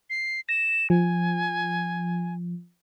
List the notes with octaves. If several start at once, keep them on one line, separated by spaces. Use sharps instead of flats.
C7
A#6 E7
F3 G#5